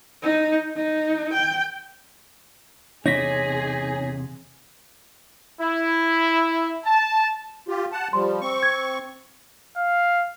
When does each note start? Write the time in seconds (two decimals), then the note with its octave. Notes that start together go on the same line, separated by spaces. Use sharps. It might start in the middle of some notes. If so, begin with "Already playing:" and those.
0.23 D#4
0.76 D#4
1.33 G5
3.06 E2 C3 D#4 G#4 C#5 A#6 B6
5.61 E4
6.85 A5
7.68 F4 G4
7.92 F#5 A5
8.13 F3 G3 C6
8.41 C4 C#6
8.63 G#6
9.77 F5